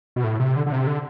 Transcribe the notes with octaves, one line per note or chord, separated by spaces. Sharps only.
B2
A2
C3
D3
D3
C3
D3